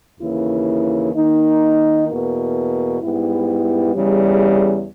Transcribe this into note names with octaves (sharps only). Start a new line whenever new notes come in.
D#2 C#3 E3 A#3 E4
D#3 A#3 D#4
E2 B2 A#3
G#2 G3 B3 E4
E2 C#3 G3